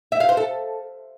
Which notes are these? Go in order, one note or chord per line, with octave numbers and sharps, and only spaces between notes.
E5
F5
C5
A4